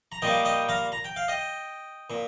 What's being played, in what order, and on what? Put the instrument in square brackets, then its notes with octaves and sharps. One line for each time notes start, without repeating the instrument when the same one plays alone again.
[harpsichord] A#5
A#2 G3 A#3 D#5 G5
D#5 G5
F5 A#5
A#5
G5
F5
D#5 G5
A#2